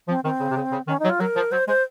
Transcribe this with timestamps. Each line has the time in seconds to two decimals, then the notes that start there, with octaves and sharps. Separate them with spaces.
0.08 F3 C4
0.24 D#3 C4
0.40 C#3
0.50 C3
0.56 C#3
0.72 C#3
0.88 D#3 C#4
1.00 D#4
1.05 F#3
1.09 F4
1.20 F#3 A#4
1.36 F3
1.52 F#3 C5
1.68 G#3 C5